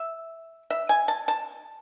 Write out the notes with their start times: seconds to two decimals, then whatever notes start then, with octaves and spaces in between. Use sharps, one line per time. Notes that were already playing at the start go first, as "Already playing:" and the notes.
Already playing: E5
0.70 E5
0.89 G#5
1.08 A5
1.28 A5